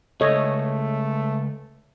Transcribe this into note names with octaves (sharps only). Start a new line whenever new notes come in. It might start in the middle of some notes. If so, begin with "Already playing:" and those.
C#2 A3 A4 C#5 D#5